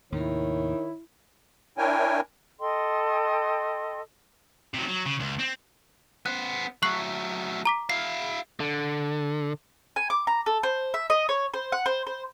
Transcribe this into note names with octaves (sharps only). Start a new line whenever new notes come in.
D#2 A2 C3 D#3 E4 C#5
D4 E4 A#4 C#5 G5 G#5
A4 D#5 G5 C6
C3 F#3
F#3
C#3
C#2
C4
B3 C5 F#6
F#3 A3 C#6 F#6 C7
A#5 D6 B6
E4 F5 C7
D3
G#5
D6
A#5
A4
C5
E5
D#5
C#5
C5
F#5
C5
C5